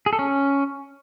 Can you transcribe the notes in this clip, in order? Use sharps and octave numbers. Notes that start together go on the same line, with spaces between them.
G#4
A4
C#4